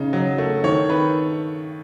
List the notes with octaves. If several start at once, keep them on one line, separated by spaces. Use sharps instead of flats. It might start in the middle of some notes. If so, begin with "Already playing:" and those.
Already playing: C#3 D#4
F#3
A3
D#3 C#5
D#3 B4